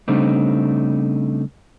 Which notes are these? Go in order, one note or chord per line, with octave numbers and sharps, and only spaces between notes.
C#3 G3 A3 C4 D4 D#4